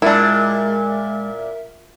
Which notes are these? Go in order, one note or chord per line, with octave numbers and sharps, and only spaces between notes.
A#2 G#3 D4 E4 A#4 E5